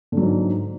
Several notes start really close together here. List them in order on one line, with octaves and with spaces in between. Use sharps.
D3 F#3 G#2